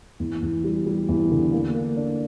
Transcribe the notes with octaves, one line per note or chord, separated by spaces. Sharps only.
E2
E2
G3
G3
E2
D3
A#3
A#3
D4